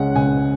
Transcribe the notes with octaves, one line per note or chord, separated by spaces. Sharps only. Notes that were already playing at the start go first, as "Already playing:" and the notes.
Already playing: C#2 C#3 G#3 C#4 F#5
C#2 G#5